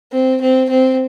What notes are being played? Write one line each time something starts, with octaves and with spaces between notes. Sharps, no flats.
C4
C4
C4